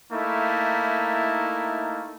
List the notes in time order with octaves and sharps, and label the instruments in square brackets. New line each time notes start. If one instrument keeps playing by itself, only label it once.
[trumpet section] A3 A#3 D#4 E4